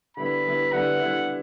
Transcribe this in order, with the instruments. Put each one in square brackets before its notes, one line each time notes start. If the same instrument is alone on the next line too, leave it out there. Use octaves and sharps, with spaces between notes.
[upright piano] D3 G3 B3 E4 [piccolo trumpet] B5
[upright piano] D3 G3 B3 E4
[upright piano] D3 G3 B3 E4 [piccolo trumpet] F#5
[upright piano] D3 G3 B3 E4